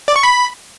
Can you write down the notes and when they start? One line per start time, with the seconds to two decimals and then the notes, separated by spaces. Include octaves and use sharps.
0.08 D5
0.16 C#6
0.23 B5